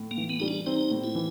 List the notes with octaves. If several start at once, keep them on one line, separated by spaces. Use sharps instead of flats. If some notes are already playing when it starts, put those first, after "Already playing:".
Already playing: A2
A#3
E3
B3
G3 D#4
D4
C4 D#4
A2
E4
E3